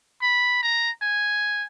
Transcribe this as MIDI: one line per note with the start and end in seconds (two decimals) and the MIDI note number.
0.22 0.58 83
0.63 0.90 82
1.02 1.65 80